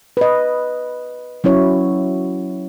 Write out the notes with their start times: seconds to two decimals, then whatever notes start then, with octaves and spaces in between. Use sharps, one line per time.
0.17 B4 D#5
1.44 F#3 C#4 E4 C#5